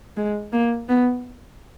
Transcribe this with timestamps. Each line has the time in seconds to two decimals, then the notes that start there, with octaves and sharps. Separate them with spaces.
0.17 G#3
0.52 A#3
0.89 B3